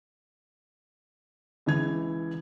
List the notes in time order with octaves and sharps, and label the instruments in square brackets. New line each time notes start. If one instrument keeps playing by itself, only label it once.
[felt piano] C#2 E3 G#6